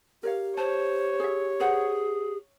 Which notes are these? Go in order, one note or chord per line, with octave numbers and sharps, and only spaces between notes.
G4 A#4 C#5 F5
C5 C#5 A5
G#4 E5
G#4 B4 C5 F#5